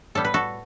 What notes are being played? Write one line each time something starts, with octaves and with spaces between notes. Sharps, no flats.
A2 G3 B3 A4
B4
F#4 A4